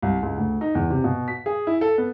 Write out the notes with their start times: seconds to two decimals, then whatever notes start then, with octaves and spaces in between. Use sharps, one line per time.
0.02 C2
0.22 C#2
0.38 D2
0.61 D#4
0.75 E2
0.90 C3
1.04 B2
1.28 B6
1.46 G#4
1.67 E4
1.81 A4
1.98 B3